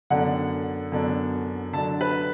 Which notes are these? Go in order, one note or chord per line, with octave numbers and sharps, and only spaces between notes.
F#2 D3 B3 D4 F#5
F#2 D3 B3 D4
D3 F#3 D4 A5
B4